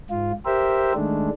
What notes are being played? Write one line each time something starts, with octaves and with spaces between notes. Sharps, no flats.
G#2 F4
G4 A#4 C5 E5
D#3 G#3 A3 D4